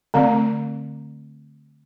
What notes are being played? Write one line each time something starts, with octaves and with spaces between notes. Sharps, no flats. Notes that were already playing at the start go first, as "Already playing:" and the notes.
D3 A3 C4 D5